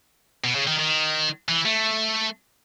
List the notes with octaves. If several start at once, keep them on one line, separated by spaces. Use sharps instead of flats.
B2
C#3
D#3
D#3
E3
A3